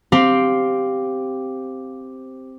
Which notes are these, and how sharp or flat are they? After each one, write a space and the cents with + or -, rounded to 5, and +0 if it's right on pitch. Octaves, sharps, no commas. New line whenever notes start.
C4 +0 G4 +0 F5 +5